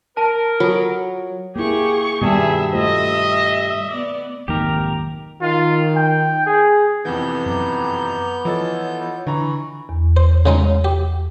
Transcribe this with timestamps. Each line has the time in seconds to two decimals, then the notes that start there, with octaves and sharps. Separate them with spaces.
0.17 A#4 A5
0.60 F#3 F4 A4
1.56 A#3 E4 G4 G#4 C#6
2.22 G2 B2 D#3 G3 A3 B3 G#4 E5
2.73 A3 F4 C5 D#5 E5
3.92 B3 D5
4.48 B1 F2 G#2 D#3 A#3 D#4 G4 A#4
5.41 D#3 F4
5.96 G5
6.46 G#4
7.05 F2 C3 E3 B3 G6
7.46 F#2 A#5 D6
8.45 E3 F3 F4 A4 C#5 D#5 A6
9.27 D3 E3 A#5 B5 C#6
9.89 E2
10.17 C5
10.46 C#3 G#3 D#4
10.84 G4